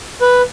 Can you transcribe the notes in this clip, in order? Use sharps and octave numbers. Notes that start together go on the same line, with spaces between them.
B4